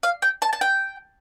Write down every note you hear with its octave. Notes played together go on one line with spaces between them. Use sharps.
F5
G5
A5
A5
G5